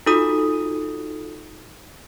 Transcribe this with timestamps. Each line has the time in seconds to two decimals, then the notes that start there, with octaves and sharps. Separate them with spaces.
0.06 D#4 F4 F#4 A4 D#6